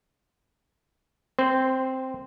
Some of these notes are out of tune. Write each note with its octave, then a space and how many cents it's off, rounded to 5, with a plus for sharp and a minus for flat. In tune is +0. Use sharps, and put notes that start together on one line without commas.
C4 +0 C5 -20